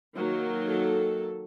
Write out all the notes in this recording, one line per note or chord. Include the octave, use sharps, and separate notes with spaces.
D#3 F#3 A#3
A4